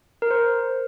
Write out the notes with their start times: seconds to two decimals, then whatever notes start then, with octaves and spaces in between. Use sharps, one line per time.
0.22 A#4
0.31 C5